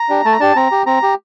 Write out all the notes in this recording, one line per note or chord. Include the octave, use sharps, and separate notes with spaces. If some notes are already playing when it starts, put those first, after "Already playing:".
Already playing: A#5
D4 G4
A3 A5
A#5
D4 G4 A5
C4 A#5
G4
C4 A#5
G4